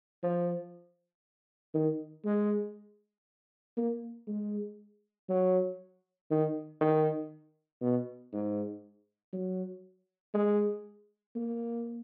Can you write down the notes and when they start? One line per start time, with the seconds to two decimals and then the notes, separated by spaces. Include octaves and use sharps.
0.23 F3
1.74 D#3
2.25 G#3
3.77 A#3
4.27 G#3
5.29 F#3
6.31 D#3
6.80 D#3
7.81 B2
8.33 G#2
9.33 F#3
10.34 G#3
11.36 A#3